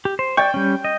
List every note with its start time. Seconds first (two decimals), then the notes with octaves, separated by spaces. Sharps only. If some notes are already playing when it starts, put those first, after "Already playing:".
0.05 G4
0.19 C5
0.37 D5 G5 C#6
0.54 G3 C#4
0.84 D#5